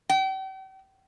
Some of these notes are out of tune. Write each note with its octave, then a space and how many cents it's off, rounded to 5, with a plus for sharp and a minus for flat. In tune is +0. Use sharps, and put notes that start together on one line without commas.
G5 -40